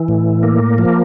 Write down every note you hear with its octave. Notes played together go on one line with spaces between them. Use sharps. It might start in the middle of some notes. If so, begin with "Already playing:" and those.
Already playing: E3
A2
A#3
F3